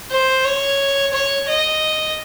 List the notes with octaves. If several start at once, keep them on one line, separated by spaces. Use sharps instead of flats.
C5
C#5
C#5
D#5